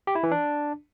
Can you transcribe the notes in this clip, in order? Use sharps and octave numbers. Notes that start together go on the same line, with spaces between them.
G4
E4
E3
D4